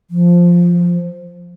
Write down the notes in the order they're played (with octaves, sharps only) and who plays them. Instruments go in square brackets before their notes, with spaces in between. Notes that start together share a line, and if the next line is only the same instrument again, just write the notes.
[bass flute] F3